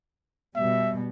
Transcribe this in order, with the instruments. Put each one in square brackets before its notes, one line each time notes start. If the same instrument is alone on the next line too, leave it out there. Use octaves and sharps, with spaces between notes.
[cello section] B2 G3 [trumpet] E5